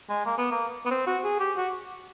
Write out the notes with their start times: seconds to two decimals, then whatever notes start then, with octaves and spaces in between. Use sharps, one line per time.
0.09 G#3
0.25 A#3
0.38 B3
0.51 A#3
0.86 B3
0.91 C4
1.07 F#4
1.24 G#4
1.40 G4
1.57 F#4